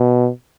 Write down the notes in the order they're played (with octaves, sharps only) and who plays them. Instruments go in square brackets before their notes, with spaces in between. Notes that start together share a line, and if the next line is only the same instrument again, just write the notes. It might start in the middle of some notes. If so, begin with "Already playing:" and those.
Already playing: [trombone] B2